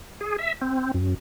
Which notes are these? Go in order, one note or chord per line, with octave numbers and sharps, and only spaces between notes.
G#4
E5
C4
F#2